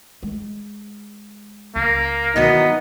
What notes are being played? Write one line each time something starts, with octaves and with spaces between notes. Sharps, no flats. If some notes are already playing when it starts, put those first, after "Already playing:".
G#3
C#2 A#3
G2 D#3 E3 F#3 B3 D#4